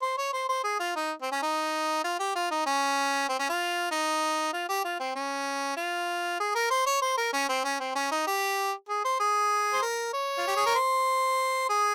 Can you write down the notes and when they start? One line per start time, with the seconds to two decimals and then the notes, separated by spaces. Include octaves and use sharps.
0.02 C5
0.18 C#5
0.33 C5
0.49 C5
0.64 G#4
0.80 F4
0.96 D#4
1.22 C4
1.32 C#4
1.42 D#4
2.04 F4
2.20 G4
2.35 F4
2.51 D#4
2.66 C#4
3.29 C4
3.39 C#4
3.49 F4
3.91 D#4
4.53 F4
4.69 G4
4.85 F4
5.00 C4
5.15 C#4
5.77 F4
6.40 G#4
6.55 A#4
6.71 C5
6.87 C#5
7.02 C5
7.17 A#4
7.33 C#4
7.49 C4
7.64 C#4
7.80 C4
7.95 C#4
8.11 D#4
8.27 G4
8.89 G#4
9.05 C5
9.20 G#4
9.73 C5
9.82 A#4
10.13 C#5
10.38 F4
10.48 G4
10.57 G#4
10.66 A#4
10.75 C5
11.69 G#4